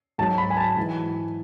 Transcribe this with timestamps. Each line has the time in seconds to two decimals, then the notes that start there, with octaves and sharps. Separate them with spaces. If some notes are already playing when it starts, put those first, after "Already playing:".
0.18 G#2 F#3 A5
0.38 B5
0.50 G#5
0.57 A5
0.77 G#2 E3